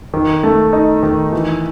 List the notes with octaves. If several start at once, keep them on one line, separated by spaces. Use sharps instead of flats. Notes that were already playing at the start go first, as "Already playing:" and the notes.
D#3
A3
D#4
D#3
E3